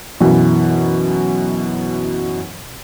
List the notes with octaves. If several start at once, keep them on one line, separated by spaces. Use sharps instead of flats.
F#2 B2 E3